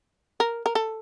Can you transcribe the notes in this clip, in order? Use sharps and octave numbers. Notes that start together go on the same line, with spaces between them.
A#4
A#4
A4